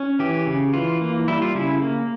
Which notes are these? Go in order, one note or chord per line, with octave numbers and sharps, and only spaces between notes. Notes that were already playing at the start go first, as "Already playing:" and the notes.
Already playing: C#4
E3 G4
C#3
E3 F4
A#3
G3 E4
F4
C#3 E4
A#3